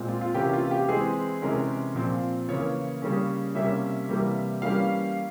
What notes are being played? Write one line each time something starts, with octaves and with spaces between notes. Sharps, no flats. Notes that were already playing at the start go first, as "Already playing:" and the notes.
Already playing: A#2 G#3 C4
F4
F4
C3 E3 A#3 C#4 G4
F4
G4
E3 G#3 C4 G#4
C3 E3 G#3 C#4 A#4
A#2 F3 C4
C#3 E3 A#3 C#5
C#3 G3 A#3 C#4
C3 G3 A#3 C#4 E5
C3 E3 G3 A#3
E3 G3 A#3 C#4 F5